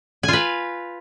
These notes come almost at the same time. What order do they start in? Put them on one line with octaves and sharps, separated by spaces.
G#5 F4 B4